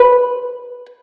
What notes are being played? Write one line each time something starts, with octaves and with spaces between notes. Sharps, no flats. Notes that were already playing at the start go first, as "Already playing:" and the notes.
Already playing: B4